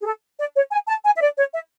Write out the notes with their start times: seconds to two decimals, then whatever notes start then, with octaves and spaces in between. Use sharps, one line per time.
0.01 G#4
0.05 A4
0.38 D5
0.55 C#5
0.71 G#5
0.87 A5
1.04 G#5
1.16 E5
1.21 D5
1.37 C#5
1.54 E5